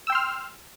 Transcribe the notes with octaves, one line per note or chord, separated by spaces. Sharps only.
G5 C6 E6 F6